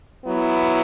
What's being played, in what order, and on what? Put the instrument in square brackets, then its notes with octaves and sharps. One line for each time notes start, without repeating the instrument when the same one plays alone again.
[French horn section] F#3 B3 E4